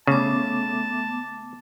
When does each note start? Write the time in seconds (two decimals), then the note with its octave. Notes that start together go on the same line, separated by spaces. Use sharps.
0.07 C#3 A3 B3 A5 D6